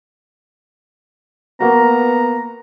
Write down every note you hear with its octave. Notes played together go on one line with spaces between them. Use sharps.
A#3 B3 F#4 A#5